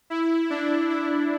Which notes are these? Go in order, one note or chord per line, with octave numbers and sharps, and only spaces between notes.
E4
D4
E4